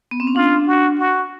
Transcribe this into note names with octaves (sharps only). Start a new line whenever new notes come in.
B3
C4
C#4
D4 F4
F#4
F#4